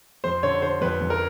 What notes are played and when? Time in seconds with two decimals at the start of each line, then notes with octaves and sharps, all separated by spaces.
0.24 F2 C5
0.43 D3 C#5
0.62 D3 C5
0.81 F2 B4
1.01 F2
1.10 A#4